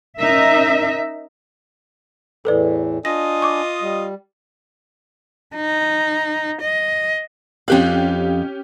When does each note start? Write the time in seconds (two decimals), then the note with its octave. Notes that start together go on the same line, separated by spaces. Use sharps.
0.19 C#4 D#4 A#4 E5
2.45 E2 A2 E3 A4 B4 D5
3.05 D4 F4 D#5 G#5 A#6
3.42 C#6 D6
3.82 G3
5.55 D#4
6.61 D#5
7.68 F2 C#4 G4 F5 F#6